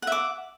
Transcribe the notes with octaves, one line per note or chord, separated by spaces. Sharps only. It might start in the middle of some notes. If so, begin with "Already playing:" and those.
E5 F#5 D6